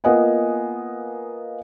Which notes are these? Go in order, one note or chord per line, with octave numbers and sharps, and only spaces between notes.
A#3 B3 F4 D#5 F#5 G#5